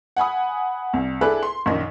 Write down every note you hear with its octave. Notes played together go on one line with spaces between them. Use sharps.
F#5 G#5 B5 D#6
C2
D4 E4 G#4 A4 B4 G#5
C6
A#1 F#2 D#3 D#5